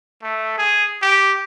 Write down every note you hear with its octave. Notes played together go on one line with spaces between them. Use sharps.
A3
G#4
G4